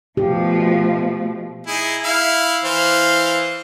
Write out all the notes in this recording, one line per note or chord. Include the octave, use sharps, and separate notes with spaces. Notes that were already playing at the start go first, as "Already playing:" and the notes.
B2 F3 A3 G4
D#4 E4 G#4
E4 E5 F5
E3 C5 F5